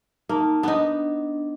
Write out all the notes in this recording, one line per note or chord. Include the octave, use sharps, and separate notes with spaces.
A#3 D#4 A5 A#5
B3 D4 D#4